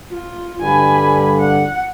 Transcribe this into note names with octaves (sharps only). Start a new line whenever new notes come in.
F4
G2 D3 G#5 B5
F#5